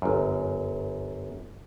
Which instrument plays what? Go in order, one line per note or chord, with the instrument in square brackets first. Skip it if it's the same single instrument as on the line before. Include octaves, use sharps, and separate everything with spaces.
[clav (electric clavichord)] G1 F#2